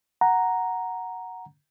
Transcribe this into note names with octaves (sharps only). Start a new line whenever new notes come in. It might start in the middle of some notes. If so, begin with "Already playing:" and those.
F#5 A#5